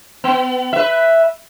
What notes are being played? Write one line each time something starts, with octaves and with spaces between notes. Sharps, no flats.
B3
B4 E5